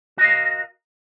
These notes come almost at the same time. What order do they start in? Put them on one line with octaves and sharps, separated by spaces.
F#4 D#5 F5 A#4